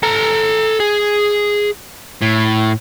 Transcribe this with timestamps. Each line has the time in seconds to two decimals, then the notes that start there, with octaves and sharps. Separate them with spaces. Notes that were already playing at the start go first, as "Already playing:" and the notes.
0.03 A4 A#5
0.80 G#4
2.22 A2